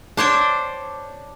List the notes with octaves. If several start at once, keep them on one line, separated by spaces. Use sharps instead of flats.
D4 C5 C#5 G5